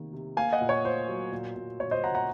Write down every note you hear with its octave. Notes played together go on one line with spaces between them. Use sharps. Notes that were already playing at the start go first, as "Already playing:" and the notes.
Already playing: C3 D#3 A#3
C3
A#3 F5 G#5
D#5 F#5
A#2
C#5
A#2 C5
F#3
A#2
A#2
A#2 C#5
C5 D#5
A#2 F#5 A#5
F#5 A#5